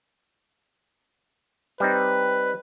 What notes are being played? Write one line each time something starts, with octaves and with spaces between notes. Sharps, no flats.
G3 C4 D#4 B4